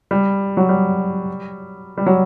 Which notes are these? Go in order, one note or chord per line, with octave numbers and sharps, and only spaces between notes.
G3
F#3
G3
G3
F#3